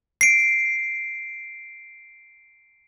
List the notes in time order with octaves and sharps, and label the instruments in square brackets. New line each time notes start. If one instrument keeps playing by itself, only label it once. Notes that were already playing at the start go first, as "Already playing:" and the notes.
[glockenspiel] C7 D7